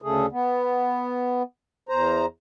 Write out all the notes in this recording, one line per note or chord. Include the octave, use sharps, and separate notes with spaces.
D2 C#3 A3 G#4
B3
E2 C5 A#5